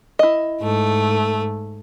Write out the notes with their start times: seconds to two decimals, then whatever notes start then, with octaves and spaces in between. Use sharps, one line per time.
0.19 E4 D#5
0.61 G#2 A3